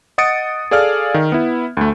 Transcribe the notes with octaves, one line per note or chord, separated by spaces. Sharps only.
D#5 F#5 D#6 A6 C#7 D7
G#4 A4 D5 F5 F6
D#3
B3 E4
D2 A3